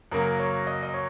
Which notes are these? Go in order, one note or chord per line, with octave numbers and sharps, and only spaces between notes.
F#2 C#3 F#3 A#3 A#4
C#5
D#5
D#5
C#5